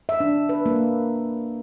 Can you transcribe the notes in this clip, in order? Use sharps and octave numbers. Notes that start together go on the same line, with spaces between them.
E5
D4
B4
A#3